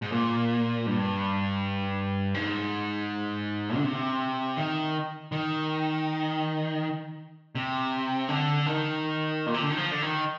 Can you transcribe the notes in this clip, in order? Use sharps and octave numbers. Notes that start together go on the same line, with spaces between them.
G#2
A#2
G2
G#2
D3
C3
D#3
D#3
C3
D3
D#3
A#2
C3
D3
D#3
F3
D3
D#3